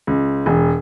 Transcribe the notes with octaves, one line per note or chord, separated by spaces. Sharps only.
C#2
E1